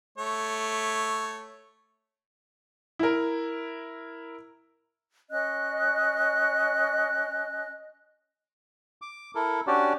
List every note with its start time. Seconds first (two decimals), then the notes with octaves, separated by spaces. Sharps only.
0.18 A3 C#5
2.99 E4 A#4
5.30 C#4 D#5 F#6
9.02 D6
9.35 E4 A4 A#4
9.67 C#4 D4 F#4 G4 D5